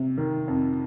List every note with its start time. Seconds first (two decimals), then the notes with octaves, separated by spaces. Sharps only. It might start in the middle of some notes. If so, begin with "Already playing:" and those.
Already playing: C3
0.18 D#3
0.48 F2